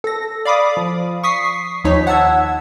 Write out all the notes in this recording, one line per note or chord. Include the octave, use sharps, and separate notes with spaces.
A4 A#6
D5 F5 B5 D6 D#6
F3
C#6 D#6 B6 C7
D#2 F3 D#4 C#5 B6
F#5 A5 E6 G#6